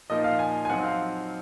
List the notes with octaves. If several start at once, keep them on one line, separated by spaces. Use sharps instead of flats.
A#2 F3 A#3 D#4 D#5
F5
G#5
G#5
F#2 F3 C4 D#4 F#5
F5